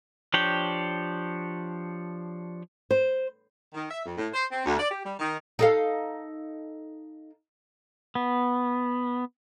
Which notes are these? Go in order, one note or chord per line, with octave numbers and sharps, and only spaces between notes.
F3 D4 G4 C#5 G5
C5
D#3
E5
F2
A2
C5
C4
D2
D5
G4
G3
D#3
D#4 A4 F5
B3